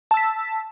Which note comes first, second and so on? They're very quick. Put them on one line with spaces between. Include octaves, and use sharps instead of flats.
A5 E6 B6